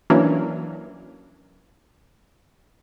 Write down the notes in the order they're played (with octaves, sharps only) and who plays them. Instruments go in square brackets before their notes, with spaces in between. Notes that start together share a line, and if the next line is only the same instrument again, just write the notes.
[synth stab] E3 F#3 A#3 C#4 D4